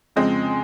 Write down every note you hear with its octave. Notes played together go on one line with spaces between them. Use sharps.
F2 C#3 F3 G#3 C4